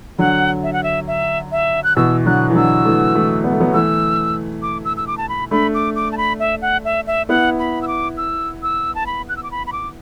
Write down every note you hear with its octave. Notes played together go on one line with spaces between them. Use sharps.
D3 F#3 F#5
E5
F#5
E5
E5
E5
F#6
B2 E3 E6
D3 F#3 F#6
E3
D3 F#3 E6
E3 A3
E3 A3
B3
A3
F#3 B3
E3 A3 E6
D6
E6
E6
D6
A5
B5
A3 D4 B5
D6
D6
A5
B5
E5
F#5
E5
E5
B3 E4 F#5
B5
E6
D6
E6
E6
A5
B5
F#6
E6
D6
B5
B5
D6